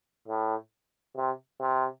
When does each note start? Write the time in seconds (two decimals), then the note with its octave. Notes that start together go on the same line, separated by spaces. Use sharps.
0.28 A2
1.17 C3
1.60 C3